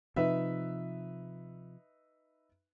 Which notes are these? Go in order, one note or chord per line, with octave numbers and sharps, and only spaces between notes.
C3 F3 D#4 B4 E5